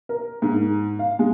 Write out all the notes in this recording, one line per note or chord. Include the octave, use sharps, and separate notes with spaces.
A#4
G#2
F5
G#3